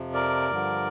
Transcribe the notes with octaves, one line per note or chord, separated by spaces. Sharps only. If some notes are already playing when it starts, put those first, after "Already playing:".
Already playing: F2 C3 F3
A#4 D5
G2 D3 F3